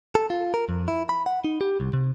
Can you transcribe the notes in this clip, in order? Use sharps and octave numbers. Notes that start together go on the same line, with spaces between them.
A4
F4
A#4
F2
E4
B5
F#5
D#4
G4
C2
C3